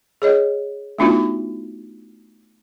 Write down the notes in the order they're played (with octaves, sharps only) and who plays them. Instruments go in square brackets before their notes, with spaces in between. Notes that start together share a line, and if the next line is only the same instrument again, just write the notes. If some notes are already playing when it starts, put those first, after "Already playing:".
[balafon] G#4 C#5 D#5
A3 B3 D4 D#4 F4 F#4